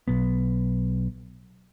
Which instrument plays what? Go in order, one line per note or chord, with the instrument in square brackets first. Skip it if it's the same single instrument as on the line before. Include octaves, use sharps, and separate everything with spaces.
[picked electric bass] B1 B3